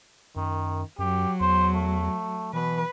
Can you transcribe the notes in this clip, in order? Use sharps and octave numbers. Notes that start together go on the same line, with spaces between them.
F#2 D#3
F#2 F#3 G4
E2 C5
A3
B2 E3 B4